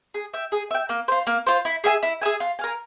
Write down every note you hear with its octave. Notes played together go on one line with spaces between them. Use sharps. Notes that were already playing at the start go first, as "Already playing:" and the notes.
G#4
E5 G5
G#4
E5 G5
A#3
F4 C5
A#3
F4 C5
E4
G#4 E5 G#5
E4
G#4 E5 G#5
F4
A#4 F5 G#5